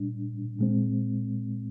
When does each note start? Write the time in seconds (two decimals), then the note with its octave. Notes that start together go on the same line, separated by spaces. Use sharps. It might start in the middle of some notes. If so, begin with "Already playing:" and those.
Already playing: A#2 G3 D4
0.59 A#2 G#3 C4